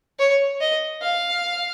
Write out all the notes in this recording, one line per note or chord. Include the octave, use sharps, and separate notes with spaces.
C#5
D#5
F5